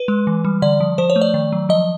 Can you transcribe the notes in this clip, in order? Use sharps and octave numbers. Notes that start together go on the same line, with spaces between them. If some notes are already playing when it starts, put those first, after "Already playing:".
Already playing: B4
G#3
E3
G3
D3 D5
F3
F3 C5
C#5
A3
D5
D#3
F#3
F3 D#5